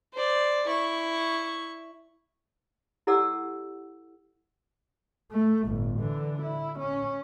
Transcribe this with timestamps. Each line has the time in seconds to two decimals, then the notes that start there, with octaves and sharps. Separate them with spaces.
0.14 C5 D5
0.67 E4 C#6
3.07 E4 G4 A4 D5 F#5 E6
5.32 A3
5.65 G1 A2
5.98 D3 E3
6.42 E4
6.79 C#4